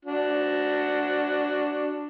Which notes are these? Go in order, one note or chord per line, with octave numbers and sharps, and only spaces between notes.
D4 F#4